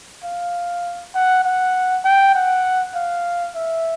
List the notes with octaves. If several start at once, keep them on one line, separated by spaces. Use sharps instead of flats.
F5
F#5
F#5
G5
F#5
F5
E5